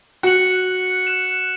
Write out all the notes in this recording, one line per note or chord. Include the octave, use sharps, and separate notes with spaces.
F#4 F#6 C#7 F#7
F#6 C#7 E7